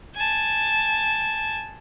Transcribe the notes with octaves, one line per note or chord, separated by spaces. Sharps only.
G#5 A5